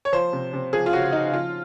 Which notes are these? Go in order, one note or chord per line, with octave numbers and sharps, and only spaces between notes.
C#5
F3 C5
C3
C3
F3 G#4
F4
C#3 F#4
C#3 D#4
F3 F4